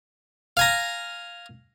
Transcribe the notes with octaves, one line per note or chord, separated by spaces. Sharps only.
F5 G#5 A#5